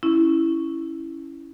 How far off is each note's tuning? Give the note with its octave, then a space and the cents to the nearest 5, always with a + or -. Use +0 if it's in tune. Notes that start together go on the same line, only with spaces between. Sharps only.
C#4 +5 E4 +0